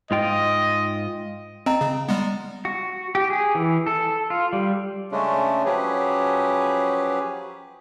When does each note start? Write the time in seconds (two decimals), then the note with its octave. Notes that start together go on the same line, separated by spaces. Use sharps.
0.11 G#2 F4 D#5 G5
1.66 C4 D#5 A#5
1.81 C#3
2.08 G3 G#3 B3
2.65 F#4
3.15 G4
3.30 G#4
3.55 E3
3.86 A4
4.30 F4
4.53 G3
5.12 C#3 G#3 A3 C#4 D4
5.65 F3 F#3 C#4 G4 G#4 B4